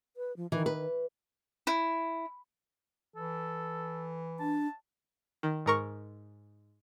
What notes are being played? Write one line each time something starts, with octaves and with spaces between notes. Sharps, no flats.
B4
F3
D#3 E3
B4
E4
E3 A4
D4 A5
D#3
G#2 A#4 C#6